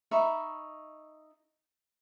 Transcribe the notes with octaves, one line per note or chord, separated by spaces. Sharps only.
D#4 E5 B5 C#6